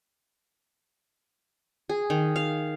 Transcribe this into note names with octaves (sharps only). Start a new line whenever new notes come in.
G#4
D#3
F5